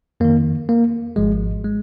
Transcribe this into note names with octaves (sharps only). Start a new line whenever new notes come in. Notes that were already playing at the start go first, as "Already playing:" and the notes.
F2 D#3 A#3
A#3
G#1 G#2 F3 G#3
G#3